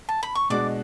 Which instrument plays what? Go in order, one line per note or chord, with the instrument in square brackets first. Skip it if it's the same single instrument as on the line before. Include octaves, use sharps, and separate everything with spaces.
[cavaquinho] A5
B5
C#6
[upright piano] B2 G#3 D4 F#4 [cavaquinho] D5 D6